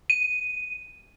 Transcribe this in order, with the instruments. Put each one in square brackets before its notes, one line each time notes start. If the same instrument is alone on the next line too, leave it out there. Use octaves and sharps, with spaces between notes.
[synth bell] D#7